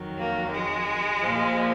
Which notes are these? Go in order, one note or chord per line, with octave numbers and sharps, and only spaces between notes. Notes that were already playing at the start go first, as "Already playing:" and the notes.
Already playing: F2 D#3 F#3
A#3
G#3
A#2 F3